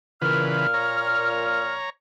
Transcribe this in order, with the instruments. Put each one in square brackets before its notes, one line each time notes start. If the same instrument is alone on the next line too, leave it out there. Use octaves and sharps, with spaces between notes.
[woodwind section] A#2 F6 [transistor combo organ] C#3 E3 B4
[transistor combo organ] C#5 A#5